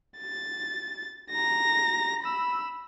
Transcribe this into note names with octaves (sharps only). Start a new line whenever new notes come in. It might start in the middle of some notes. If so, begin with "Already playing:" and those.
A6
A#5 A#6
B5 E6